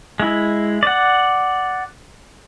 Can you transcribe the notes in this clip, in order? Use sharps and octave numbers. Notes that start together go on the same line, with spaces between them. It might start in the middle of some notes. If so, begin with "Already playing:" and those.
G#3 E4
D5 F#5